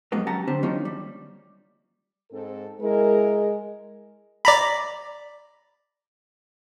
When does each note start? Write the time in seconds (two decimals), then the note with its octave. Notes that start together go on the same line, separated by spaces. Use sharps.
0.12 F2 F#3 G#3 A#3 B3
0.27 F#3 C#4 G4 F#5 A5 A#5
0.47 D3 C4 D4 G4 C5
0.63 D#3 F#3 A#3 C#4 D#4 F4
0.85 G3
2.31 G#2 C4 A4
2.81 G#3 E4 G#4 A#4
4.45 D5 A#5 B5